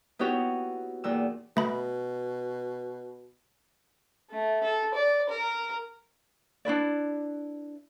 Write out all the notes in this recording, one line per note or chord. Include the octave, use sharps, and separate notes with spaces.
B3 D#4 E4 F#4 G4 C#5
E2 A#2 G5 E6
B2 A3 B5
A3
A4
D5
A#4
D4 E4 B4 D5